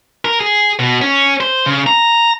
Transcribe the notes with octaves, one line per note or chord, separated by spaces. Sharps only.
A#4
G#4
B2
C#4
C5
C#3
A#5